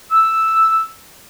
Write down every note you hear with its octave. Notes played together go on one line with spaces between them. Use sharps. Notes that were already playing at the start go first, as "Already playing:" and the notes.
E6